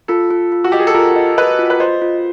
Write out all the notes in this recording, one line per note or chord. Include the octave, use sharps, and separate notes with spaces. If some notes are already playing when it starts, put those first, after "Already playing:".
F4 A4
F4
F4
F#4
G4 D#5
G#4
A4
F4 A#4
D#5
B4 D#5
F4
B4
C5 D#5
F4